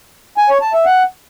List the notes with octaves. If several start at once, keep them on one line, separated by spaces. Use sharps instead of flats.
G#5
C#5
A5
E5
F#5